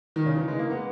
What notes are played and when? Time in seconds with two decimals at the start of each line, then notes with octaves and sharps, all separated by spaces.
0.16 D#3
0.26 C#3
0.37 E3
0.48 G#3
0.59 A#3
0.70 B3